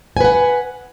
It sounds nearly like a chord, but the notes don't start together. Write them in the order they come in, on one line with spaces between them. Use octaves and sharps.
G#5 B4 F#5